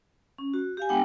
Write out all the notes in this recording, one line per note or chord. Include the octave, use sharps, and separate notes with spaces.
C#4
F#4
G4 F5 G#5
G#3 B3 D4 F#5 G5